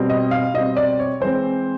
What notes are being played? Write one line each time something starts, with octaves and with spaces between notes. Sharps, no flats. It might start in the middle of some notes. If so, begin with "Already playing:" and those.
Already playing: B2 G3 C4
D#5
F5
B2 G3 C4 D#5
D5
C#5
E3 G#3 C4 C5